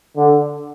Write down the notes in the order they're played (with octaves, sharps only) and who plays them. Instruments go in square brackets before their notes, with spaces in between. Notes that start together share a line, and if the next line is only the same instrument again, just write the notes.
[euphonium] D3